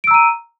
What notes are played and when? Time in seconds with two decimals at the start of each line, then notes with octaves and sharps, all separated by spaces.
0.04 D7
0.07 E6
0.11 A#5
0.14 D#7